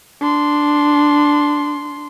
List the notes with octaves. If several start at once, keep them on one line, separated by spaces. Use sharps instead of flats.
D4 C6